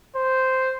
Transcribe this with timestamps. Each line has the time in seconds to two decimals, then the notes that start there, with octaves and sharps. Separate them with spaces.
0.15 C5